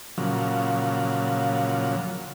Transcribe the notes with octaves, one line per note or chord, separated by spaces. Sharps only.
A#2 C#3 F3 F#3